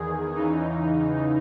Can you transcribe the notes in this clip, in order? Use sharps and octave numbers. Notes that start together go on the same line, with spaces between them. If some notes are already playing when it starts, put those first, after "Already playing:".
Already playing: E2 D#3 G#4
E2 C#3 E3 D#4